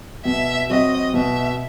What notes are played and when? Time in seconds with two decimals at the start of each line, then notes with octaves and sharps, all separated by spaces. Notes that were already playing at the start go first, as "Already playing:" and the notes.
0.25 B2 E5
0.69 F#3 C4 F#4 D#5
1.14 B2 E5